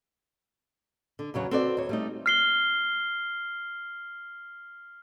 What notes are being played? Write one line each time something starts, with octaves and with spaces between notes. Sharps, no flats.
D3
E2 C#3 F#3 C#5
C4 F#4 A4 B4 D5
D#2 C#5
G3 A3 D#4
F6 C7 G7